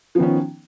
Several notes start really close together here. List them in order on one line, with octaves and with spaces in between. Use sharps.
F3 B3 D#3 C#4